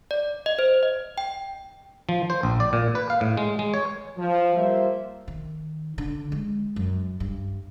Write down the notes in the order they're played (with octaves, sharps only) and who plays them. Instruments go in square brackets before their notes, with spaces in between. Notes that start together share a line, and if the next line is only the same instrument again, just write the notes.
[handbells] D5
D#5
C5
D#5
G5
[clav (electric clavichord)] F3
C5
A#1
D5
A#2
B4
F5
A2
G#3
G#3
C#5
[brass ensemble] F3
G3 A#3 F4 C5 E5
[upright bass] D#3
D3
G#3
F#2
G2